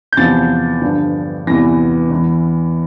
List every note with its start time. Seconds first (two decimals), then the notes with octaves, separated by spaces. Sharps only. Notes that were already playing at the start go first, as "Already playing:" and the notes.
0.13 G6
0.17 E2 C3 F3 A6
0.82 G2 D3 F3
1.47 E2 C3 E3 A#6
2.11 E2 E3